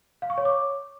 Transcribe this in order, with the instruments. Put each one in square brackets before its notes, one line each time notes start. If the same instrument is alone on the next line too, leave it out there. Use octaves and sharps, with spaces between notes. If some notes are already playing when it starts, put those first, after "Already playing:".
[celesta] F5
C#6
C#5
D6